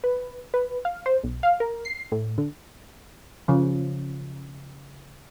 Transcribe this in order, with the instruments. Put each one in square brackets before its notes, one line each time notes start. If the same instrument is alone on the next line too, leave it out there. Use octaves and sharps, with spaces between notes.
[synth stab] B4
B4
F5
C5
B1
F5
A#4
C7
A2
D3
[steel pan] C#3 F3